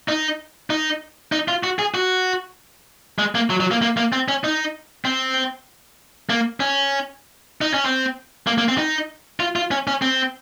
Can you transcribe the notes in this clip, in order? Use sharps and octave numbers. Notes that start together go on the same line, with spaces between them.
D#4
D#4
D#4
F4
F#4
G#4
F#4
G#3
A#3
F#3
F#3
A#3
A#3
A#3
C4
C#4
D#4
C4
A#3
C#4
D#4
C#4
C4
A#3
A#3
C4
D#4
F4
F4
C#4
C#4
C4